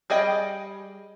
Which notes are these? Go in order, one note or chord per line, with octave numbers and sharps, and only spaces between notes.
G3 G#4 D5 D#5 G5